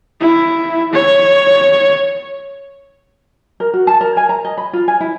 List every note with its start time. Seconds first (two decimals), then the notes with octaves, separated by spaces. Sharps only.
0.21 E4
0.93 C#5
3.60 A#4
3.74 F#4
3.87 A5
4.01 A#4
4.17 G#5
4.29 A#5
4.45 D#5
4.58 B5
4.73 F4
4.88 G#5
5.01 E4